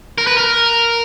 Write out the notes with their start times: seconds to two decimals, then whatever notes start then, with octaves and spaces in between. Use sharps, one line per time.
0.18 A#4
0.27 B4
0.37 A#4